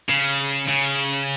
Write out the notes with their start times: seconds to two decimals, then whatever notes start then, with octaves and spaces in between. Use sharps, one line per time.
0.10 C#3
0.69 C#3